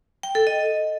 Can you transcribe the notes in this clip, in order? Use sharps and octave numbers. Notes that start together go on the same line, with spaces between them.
G5
A4
D#5